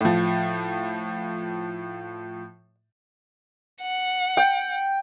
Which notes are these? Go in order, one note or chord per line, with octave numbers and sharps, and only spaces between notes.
A2 F3
F#5
G5